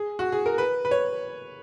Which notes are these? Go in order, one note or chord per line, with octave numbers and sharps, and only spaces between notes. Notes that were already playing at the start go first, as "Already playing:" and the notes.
Already playing: G#4
F#4
G#4
A#4
B4
B4
C#5